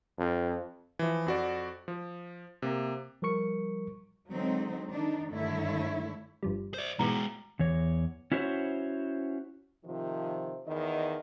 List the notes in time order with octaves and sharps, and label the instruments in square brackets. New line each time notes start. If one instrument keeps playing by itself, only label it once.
[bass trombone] F2
[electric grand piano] E3 F3
F2 F#4 D5
F3
C3 A#3
[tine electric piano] F3 G3 A#4 C#6 C#7
[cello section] D3 F#3 G#3 C4 D#4
D#3 D4 D#4
G2 D3 D#3 A3 E4 C#5
[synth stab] G1 F3 G3
[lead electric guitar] C5 D5
[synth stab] G#2 B2 E3 [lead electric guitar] G#3 F#4 [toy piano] G#4 A#5
[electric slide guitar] E2 E3 C#5
C#4 E4 F#4 C5 C#5
[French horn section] C3 D#3 F3
E2 D#3 D#5